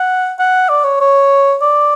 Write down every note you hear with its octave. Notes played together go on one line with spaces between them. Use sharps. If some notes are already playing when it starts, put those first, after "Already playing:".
Already playing: F#5
F#5
D5
C#5
C#5
D5